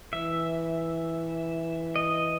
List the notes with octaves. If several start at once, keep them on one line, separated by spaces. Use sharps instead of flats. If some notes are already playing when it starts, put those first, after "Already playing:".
E3 E5
D#5